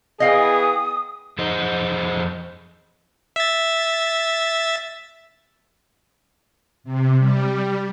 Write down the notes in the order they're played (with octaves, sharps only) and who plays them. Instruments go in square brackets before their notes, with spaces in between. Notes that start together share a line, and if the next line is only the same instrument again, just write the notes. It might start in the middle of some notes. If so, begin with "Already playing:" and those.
[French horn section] E3 B3 G#4 [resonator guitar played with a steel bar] D#5 F5 G5 [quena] D#6
[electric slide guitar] F2 G#4 C5 D#5
[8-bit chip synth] E5 A6
[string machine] C3
G3